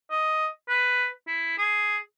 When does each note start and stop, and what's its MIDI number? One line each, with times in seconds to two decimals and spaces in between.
0.11 0.47 75
0.69 1.07 71
1.27 1.54 64
1.58 1.97 68